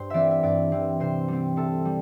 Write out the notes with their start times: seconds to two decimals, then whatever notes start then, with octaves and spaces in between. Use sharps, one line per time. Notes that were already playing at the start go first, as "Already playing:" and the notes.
Already playing: G2 C5
0.10 E3 C4 D5 E5
0.31 E5
0.43 G2 D5
0.72 E3 C4
1.00 C3 C5
1.28 G3 C4
1.56 C3 A4
1.85 G3